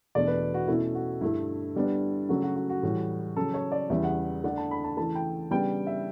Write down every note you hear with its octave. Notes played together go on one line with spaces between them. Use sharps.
E2 B2 A3 D4 D5
B4
F#4
B2 A3 C#4 E4
F#4
G2 D3 A3 E4
D3 G3 B3 D4
C#3 F#3 A3 C#4 F#4
F#4
F#4
F#4
A2 E3 G3
C#3 F#3 C#4 A4
C#5
D5
E2 C#3 E3 G3 B3 E5
F#5
D3 A3 D4 F#5
A5
B5
A5
C#3 E3 A3 A5
G5
C#3 G3 B3 D4 G5
E5